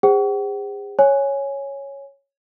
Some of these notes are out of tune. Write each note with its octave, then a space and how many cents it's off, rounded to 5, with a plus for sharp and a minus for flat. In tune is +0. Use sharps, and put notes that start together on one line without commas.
G#4 -40 C5 +0 F#5 +40
C#5 +0 G#5 +0